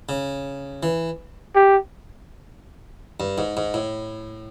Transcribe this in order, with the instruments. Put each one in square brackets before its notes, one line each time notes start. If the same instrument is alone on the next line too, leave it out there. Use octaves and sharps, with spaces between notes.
[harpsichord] C#3
E3
[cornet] G4
[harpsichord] G2
G#2
G#2
A2